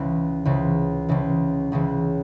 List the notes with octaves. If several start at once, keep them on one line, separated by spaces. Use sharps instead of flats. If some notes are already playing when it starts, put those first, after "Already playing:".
Already playing: C#2 C#3 E3
C#2 C#3 E3
C#2 C#3 E3
C#2 C#3 E3